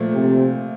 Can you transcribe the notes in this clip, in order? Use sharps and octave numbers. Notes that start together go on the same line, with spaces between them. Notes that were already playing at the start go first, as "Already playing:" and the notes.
Already playing: A#2 F3 A3
C3